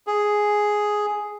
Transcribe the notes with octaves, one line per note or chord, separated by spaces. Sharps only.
G#4